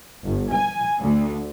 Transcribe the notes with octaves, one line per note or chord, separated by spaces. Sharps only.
G1
G#5
D2